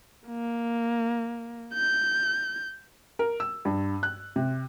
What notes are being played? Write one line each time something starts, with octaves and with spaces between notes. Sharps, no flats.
A#3
G6
A#4
E6
G2
F#6
C3